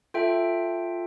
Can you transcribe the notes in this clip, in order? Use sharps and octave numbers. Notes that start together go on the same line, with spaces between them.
F4 A4 E5 G5